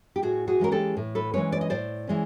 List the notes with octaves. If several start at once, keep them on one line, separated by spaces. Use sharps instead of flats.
G4
A2 F#4 G#4
F#4 G#4
E3 G#3 C#4 A#4
G4 A4
A2
A4 B4
E3 G#3 C#4 B4 C#5
D5
D#5
A2 C5 D5
E3 G#3 C#4